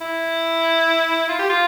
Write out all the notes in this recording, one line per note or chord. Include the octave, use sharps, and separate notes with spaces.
E4
F4
G4
F4